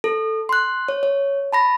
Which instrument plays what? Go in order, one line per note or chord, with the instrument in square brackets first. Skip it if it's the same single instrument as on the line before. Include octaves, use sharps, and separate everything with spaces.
[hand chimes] A4
C6 F#6
C#5
C#5
A5 B5 A#6